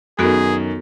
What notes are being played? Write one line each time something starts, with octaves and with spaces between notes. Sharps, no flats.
F#2 D#3 B3 F#4 G#4 A4